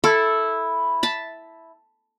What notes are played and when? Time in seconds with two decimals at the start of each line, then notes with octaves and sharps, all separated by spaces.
0.04 E4 A4
1.03 A5 B5